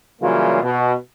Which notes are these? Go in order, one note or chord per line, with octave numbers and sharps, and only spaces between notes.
C#3 E3 F#3 G3 A#3 F4
B2